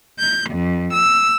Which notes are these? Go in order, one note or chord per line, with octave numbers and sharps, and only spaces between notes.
G6
F2
E6